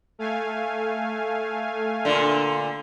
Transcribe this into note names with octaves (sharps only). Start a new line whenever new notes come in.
A3 F5 G#5
A#2 D3